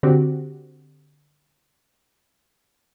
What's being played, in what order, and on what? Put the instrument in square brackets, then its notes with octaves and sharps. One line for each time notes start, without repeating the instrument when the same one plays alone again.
[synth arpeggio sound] D3 C4 F#4 G4